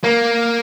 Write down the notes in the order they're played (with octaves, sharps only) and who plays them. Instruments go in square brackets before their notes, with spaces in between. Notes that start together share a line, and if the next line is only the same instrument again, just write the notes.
[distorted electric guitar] A#3